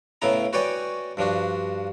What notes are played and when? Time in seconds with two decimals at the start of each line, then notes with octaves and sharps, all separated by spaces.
0.22 A2 C#3 B3 E4 A#5
0.53 F#4 B4 C#5 D5 G5 G#5
1.17 G2 F3 D4 F#4